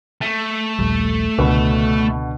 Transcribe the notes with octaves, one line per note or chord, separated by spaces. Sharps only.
A3 A6 D#7
D#1 A#1 G3
C#2 B2 D3 B5